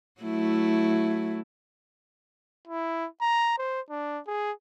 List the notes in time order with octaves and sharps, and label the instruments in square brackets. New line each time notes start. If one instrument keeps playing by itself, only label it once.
[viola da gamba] F#3 A3 E4
[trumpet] E4
A#5
C5
D4
G#4